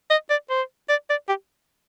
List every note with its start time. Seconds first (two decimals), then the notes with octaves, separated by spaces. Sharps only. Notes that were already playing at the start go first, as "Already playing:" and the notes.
0.10 D#5
0.30 D5
0.50 C5
0.89 D5
1.10 D5
1.29 G4